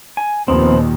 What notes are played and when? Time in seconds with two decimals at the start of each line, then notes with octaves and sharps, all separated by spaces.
0.17 G#5
0.48 D#2 A#2 F3 B3 C4